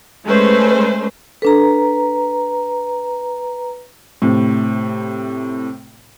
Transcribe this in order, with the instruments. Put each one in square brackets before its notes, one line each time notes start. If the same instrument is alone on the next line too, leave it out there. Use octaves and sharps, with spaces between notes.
[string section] G#3 A3 C#4 B4 C5
[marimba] D4 A4 [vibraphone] B4 A#5
[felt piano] A2 C3